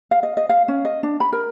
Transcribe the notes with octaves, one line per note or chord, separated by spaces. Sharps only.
F5
D#5
D#5
F5
C#4
D#5
D4
B5
A#4